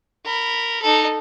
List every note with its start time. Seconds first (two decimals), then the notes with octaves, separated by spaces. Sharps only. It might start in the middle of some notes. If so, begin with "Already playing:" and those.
0.25 A#4 B5
0.82 D#4 A4